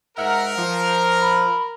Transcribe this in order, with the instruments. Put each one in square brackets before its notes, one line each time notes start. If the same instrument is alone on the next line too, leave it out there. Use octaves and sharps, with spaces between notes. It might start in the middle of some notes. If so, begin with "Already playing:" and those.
[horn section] G#2 E5 F#5 [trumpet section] A#4
[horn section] F3
[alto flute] B5